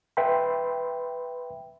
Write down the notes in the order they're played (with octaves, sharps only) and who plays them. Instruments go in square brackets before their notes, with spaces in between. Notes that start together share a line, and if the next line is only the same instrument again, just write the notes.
[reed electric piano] B4 E5 G5 B5 C6